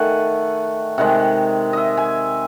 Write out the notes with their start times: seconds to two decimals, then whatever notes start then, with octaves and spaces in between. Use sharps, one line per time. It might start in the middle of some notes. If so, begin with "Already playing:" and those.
Already playing: D#3 A3 F#5 G#5
0.98 C3 D#3 G#3 F#5
1.73 D#5 E5
1.97 G#5